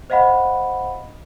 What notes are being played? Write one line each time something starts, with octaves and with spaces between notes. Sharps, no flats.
C5 D#5 F5 F#5 B5